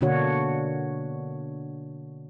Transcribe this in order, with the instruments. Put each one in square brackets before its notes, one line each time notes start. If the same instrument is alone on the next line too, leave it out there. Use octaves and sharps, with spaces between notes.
[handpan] B2 D3 A#3 D4 F#4 C#5